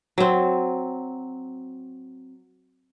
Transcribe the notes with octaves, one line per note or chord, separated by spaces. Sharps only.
F#3 C4